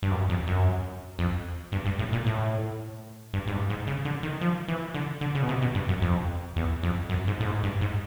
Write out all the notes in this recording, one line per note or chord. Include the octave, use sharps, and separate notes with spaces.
G2
F#2
F2
F#2
F2
G2
G2
A2
A#2
A2
G2
G#2
G2
G#2
C#3
D3
D#3
F3
E3
D3
D3
C#3
B2
C3
B2
G2
F#2
F2
E2
F2
F#2
G#2
A2
G#2
G2
G#2